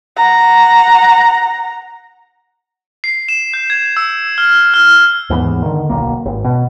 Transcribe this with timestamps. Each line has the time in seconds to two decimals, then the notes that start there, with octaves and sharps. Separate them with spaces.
0.17 F#5 A#5
3.04 C7
3.28 E7
3.54 G6
3.70 G#6
3.97 E6
4.38 F6
4.74 F6
5.30 D#2 G#2 E3 B3
5.62 D3 D#3
5.90 D1 B1 A#3
6.25 G#1
6.44 B2